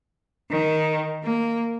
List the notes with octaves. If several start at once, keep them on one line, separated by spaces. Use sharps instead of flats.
D#3
A#3